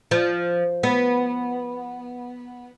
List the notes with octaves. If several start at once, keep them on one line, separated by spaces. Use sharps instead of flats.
F3
B3